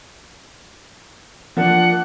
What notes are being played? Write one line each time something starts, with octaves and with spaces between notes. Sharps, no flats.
F3 A#3 D4 F#5